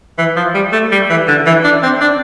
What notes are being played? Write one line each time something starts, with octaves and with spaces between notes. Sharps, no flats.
E3
F3
G3
A3
G3
E3
D3
E3
D4
C4
D4